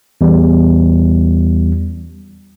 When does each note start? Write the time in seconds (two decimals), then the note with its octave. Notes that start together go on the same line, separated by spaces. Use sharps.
0.21 E2 G3